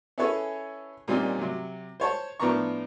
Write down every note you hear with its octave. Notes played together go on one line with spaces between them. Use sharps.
C#4 E4 G#4 A4 B4 C#5
A#2 G3 C4 C#4 D#4
C3 F#3
C5 C#5 A5
A2 F3 B3 D4 A#5 C#6